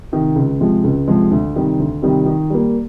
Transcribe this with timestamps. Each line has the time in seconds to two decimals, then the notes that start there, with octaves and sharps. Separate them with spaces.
0.12 C3 D#3
0.36 C#2
0.60 C3 F3 G#3
0.84 C#2
1.08 C3 F3 G#3
1.31 D2
1.56 C3 D#3 G3
1.79 D2
2.02 C3 D#3 G3
2.26 D#3
2.50 G3 A#3